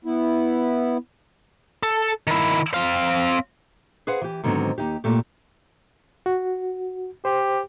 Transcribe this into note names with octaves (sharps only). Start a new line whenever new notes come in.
B3 E4
A4
D#3 E4
C4 F5
G#4 B4 C5 F5 F#5
E3 G4
G#2 D3 D#3 F#3 B3 C4
D#2 D#4 G4
A#2 A3 G4
F#4
G4 C5